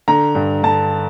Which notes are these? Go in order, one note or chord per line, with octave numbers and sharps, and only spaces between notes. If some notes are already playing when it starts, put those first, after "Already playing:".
D3 A#5
G2
D3 A5